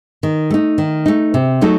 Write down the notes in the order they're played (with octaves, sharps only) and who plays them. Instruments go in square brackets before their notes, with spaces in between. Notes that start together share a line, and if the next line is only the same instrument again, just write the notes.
[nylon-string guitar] D#3
A3 D#4
D#3
A3 D#4
C3
F#3 A3 D#4 A4